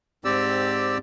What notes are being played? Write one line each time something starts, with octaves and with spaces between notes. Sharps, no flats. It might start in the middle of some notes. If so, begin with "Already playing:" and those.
G#2 C4 G4 D5 E6